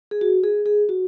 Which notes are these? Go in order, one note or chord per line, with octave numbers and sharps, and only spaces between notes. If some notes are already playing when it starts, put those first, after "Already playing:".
G#4
F#4
G#4
G#4
F#4